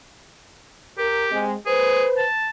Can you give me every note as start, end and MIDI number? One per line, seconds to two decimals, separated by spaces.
0.98 1.44 67
0.98 1.24 70
1.32 1.54 56
1.32 1.54 60
1.66 2.06 68
1.66 2.23 71
1.66 2.23 72
2.17 2.50 81